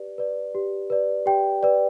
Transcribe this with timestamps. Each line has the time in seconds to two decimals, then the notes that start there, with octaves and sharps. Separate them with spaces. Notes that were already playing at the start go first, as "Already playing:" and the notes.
Already playing: G4 B4 D5
0.18 B4 D5
0.55 G4
0.90 B4 D5
1.26 G4 G5
1.63 B4 D5